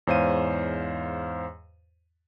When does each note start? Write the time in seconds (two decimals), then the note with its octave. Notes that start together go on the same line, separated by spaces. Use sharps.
0.07 E2 G#2 C5 C#5 F5 D#7